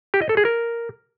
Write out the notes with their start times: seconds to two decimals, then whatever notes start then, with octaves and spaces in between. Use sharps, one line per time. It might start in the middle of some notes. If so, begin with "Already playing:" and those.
0.14 G4
0.22 D#5
0.29 A4
0.37 G#4
0.45 A#4